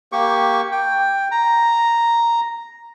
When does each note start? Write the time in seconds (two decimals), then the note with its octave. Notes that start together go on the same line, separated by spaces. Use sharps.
0.12 A#3 G4 C#6
0.72 G5
1.31 A#5